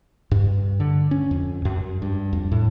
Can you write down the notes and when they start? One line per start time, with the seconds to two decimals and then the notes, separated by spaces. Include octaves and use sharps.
0.31 G2
0.80 D3
1.11 C#4
1.31 F2
1.65 F#2
2.02 G2
2.33 F2
2.52 A2